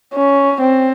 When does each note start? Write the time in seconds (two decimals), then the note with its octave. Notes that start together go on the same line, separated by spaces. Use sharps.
0.14 C#4
0.61 C4